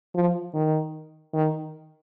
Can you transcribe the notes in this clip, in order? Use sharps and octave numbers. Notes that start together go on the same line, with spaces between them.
F3
D#3
D#3